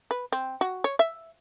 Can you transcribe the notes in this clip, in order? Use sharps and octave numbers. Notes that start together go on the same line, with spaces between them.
B4
C4
F#4
C#5
E5